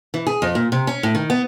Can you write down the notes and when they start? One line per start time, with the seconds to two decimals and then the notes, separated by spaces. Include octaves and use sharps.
0.14 E3
0.27 G#4
0.42 F2
0.55 A#2
0.72 C3
0.87 C#4
1.03 A2
1.15 D#3
1.30 B3